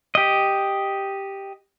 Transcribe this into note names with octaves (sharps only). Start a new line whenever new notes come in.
G4 D#5